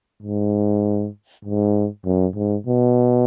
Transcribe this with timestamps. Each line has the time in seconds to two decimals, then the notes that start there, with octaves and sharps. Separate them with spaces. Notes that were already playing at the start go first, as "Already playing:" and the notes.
0.22 G#2
1.45 G#2
2.05 F#2
2.36 G#2
2.66 B2